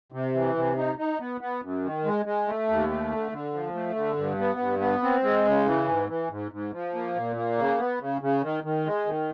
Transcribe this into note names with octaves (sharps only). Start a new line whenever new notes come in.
C3
E3
C3
D#4
D#4
B3
B3
F#2
D#3
G#3
G#3
A3
D#2
A3
D3
D3
F3
A3
D3
G2
B3
G2
B3
C4
G#3
C#3
E3
G#2
E3
G#2
G#2
F3
A#3
A#2
A#3
C#3
B3
C#3
C#3
D#3
D#3
G#3
D#3